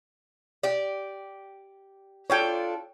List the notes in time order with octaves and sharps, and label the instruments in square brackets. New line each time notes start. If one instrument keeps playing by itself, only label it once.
[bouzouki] G4 D5
[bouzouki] D4 F4 A4 [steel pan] C#5 G5